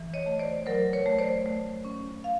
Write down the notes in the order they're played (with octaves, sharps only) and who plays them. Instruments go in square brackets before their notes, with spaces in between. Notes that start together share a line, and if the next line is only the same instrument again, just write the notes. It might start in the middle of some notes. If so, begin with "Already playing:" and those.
Already playing: [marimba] E3
C#5 D#5
A3
C5 D5
F#3 A#4 C5
B4 C#5
A3
C5 D5
A3
C#4
F5